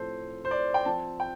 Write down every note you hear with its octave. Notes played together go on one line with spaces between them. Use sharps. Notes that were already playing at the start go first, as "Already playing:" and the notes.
Already playing: A2 F3 C4 A4 C5
C5
D5
G5
F3 C4 A5
G5